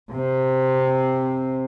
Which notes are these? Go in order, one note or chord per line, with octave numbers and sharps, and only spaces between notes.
C3 C4